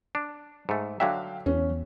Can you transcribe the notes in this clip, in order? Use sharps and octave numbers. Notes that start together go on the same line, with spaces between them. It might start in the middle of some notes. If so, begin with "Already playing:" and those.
D4
G#2 A3
D3 F#3 E5 F5 G5
E2 C#4